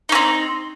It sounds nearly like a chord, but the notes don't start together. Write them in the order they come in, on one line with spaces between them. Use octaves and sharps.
D#4 C#4 C4